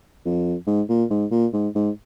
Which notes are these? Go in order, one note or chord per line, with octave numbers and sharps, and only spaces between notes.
F2
G#2
A#2
G#2
A#2
G#2
G#2